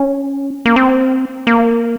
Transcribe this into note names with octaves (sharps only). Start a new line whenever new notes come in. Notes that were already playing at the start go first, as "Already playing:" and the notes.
Already playing: C#4
A#3
C4
A#3